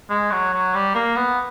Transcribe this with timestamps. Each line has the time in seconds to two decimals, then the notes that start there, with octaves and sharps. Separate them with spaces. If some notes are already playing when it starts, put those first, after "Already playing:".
0.10 G#3
0.31 F#3
0.53 F#3
0.74 G3
0.95 A#3
1.16 B3